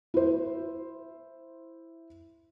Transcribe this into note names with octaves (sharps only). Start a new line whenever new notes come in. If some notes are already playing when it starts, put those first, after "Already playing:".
E4 C5